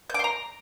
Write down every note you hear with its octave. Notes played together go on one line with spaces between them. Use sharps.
A#5 C6 D6 G6